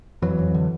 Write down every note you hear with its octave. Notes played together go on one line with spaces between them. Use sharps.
F2 E3 F#3
F2
D3